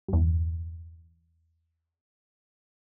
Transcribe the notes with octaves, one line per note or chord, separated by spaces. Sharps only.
E2 G2